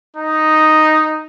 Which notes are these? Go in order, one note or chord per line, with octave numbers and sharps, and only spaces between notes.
D#4